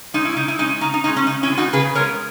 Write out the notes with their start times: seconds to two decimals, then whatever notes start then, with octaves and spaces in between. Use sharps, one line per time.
0.14 G#3 C#4 D#4
0.25 E4
0.36 C#3 D#4
0.48 E4
0.59 G#3 C#4 D#4
0.81 C#3 D#4
0.94 D#4
1.04 C#4 D#4
1.08 G#3
1.16 C#4
1.27 C#3 D#4
1.43 C#4 E4
1.50 G#3 B3
1.57 D#4 F#4
1.73 C#3 G#4 B4
1.95 G#3 B3 A#4 C#5